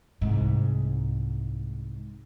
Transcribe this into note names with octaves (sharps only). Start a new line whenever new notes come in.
C2 G#2